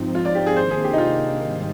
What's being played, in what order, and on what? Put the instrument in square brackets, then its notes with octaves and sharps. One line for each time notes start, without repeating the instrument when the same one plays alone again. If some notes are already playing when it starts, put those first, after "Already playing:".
Already playing: [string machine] G#2 F3 C4 D#4
[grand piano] F4
D5
G4
G#4
[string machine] C3 D#3 A#3 D4 [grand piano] C5
[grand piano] G#4
G4
D#4
F4
[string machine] G#2 D#3 G3 C4 D#4